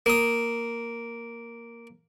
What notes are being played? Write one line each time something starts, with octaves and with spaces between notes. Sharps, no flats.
A#3 D#6